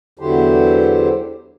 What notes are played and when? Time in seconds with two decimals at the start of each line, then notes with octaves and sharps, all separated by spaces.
0.19 E2 D3 F#3 E4 G4 C5